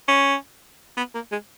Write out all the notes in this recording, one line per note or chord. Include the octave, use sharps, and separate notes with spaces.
C#4
B3
A#3
G#3